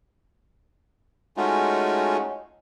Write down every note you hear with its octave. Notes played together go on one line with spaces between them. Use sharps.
G#3 A3 C#4 D#4 F4 F#4